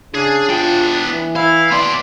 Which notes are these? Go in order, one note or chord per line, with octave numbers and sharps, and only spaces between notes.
C#3 D4 G#4
B3 F4 G5
E3
E4 F5
B3 D5 C6